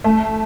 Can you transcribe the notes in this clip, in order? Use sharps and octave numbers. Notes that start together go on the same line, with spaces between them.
A3